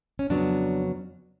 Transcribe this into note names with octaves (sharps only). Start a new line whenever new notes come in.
C#4
F2 C#3 F#3 B3 D4